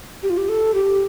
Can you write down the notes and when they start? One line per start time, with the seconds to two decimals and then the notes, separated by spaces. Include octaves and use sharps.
0.23 G4
0.30 F4
0.38 G4
0.49 A4
0.74 G4